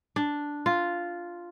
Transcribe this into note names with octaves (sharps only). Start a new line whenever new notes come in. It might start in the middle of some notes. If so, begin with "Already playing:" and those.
D4
F4